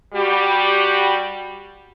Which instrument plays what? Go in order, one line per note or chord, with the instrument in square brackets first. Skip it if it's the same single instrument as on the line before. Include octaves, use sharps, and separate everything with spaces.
[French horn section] G3 F#4 G4